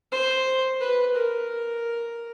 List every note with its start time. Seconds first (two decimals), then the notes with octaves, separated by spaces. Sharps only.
0.12 C5
0.81 B4
1.16 A#4